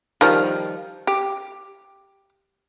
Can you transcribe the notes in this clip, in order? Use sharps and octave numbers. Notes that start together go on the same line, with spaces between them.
D#3 F3 G3
G4